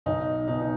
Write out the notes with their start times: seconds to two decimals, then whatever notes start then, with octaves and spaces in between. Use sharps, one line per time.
0.06 B1 D#4
0.48 B2 D#4
0.61 D#4